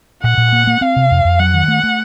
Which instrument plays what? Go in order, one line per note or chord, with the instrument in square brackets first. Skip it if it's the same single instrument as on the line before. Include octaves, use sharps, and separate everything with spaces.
[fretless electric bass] A#2 [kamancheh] F#5
[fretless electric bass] A#2
A#3
A#3
[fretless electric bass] C4 [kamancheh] F5
[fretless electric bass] C3
F2
F2
[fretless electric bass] F#3 [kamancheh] F#5
[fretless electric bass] D#3
A3
A3